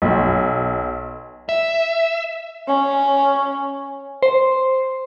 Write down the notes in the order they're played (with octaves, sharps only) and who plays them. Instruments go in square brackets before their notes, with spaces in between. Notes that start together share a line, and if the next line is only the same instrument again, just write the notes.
[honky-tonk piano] B1
[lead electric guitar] E5
[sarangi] C#4
[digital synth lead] C5